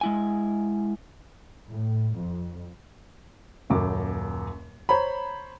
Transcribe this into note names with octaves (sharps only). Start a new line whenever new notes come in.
G#3 E4 G#5
A2
F2
D#1 F#2 D6
C5 C#5 A#5 B5